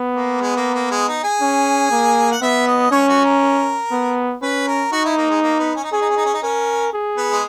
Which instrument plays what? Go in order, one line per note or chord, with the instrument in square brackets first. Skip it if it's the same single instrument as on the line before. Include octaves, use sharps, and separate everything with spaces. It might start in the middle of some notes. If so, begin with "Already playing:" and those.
Already playing: [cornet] B3
[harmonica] A#3
G#3
A#3
A#3
G#3
D#4
G#4
[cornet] C#4
A#3
[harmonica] F#5
[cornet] B3 [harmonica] E5
[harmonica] D#5
[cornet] C#4 [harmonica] C#5
[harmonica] F#4
A#4
[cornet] B3
[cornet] C#4 [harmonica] B4
[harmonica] A#4
[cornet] D#4 [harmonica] F#4
[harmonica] E4
A#3
G#3
A#3
B3
C#4
D#4
[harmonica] C#4 [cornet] G#4
[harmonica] D#4
C#4
D#4
C#4
D#4
[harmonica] C#4 [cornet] A#4
[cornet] G#4
[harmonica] B3
G#3